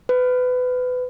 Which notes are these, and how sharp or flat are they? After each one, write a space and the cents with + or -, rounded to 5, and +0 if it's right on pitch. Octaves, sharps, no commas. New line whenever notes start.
B4 +25